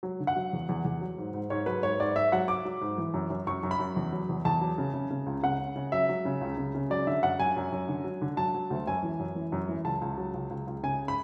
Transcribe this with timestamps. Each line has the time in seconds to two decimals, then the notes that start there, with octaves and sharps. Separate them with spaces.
0.03 F#3
0.20 D3
0.27 F#5
0.36 F#3
0.53 E2
0.69 E2
0.85 E2
1.01 F#3
1.18 G#2
1.34 G#2
1.50 G#2 C#5
1.66 F#3 B4
1.83 G#2 C#5
2.00 G#2 D5
2.16 G#2 E5
2.32 F#3 F#5
2.48 F#3 D6
2.65 F#3
2.81 G#2
2.98 E3
3.14 F#2
3.30 F#2
3.47 F#2 C#6
3.63 F#2
3.71 B5
3.79 F#2
3.96 E2
4.12 F#3
4.29 E2
4.45 E2 A5
4.61 F#3
4.78 C#3
4.94 C#3
5.10 C#3
5.26 C#2
5.43 C#3 F#5
5.59 C#3
5.76 C#3
5.92 F#3 E5
6.09 F#3
6.25 C#3
6.41 C#2
6.57 C#3
6.75 C#3
6.90 F#3 D5
7.07 D3 E5
7.23 F#2 F#5
7.40 F#2 G#5
7.56 F#2
7.72 F#2
7.88 D3
8.04 F#3
8.22 D3
8.37 F#3 A5
8.54 F#3
8.70 D2
8.87 F#2 G#5
9.03 E3
9.19 F#2
9.35 E3
9.52 F#2
9.69 E3
9.84 C#2 A5
10.01 C#2
10.18 F#3
10.34 C#2
10.50 C#2
10.67 C#2
10.83 C#3 G#5
11.08 B5